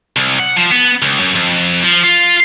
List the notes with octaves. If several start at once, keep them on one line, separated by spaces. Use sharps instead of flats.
C2
F#5
F3
B3
C#2
F#2
F2
F3
F4